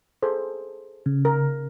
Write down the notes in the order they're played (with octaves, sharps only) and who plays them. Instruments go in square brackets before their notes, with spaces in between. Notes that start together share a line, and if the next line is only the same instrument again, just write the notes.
[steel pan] G#4 A4 C5
[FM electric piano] C#3
[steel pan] A#4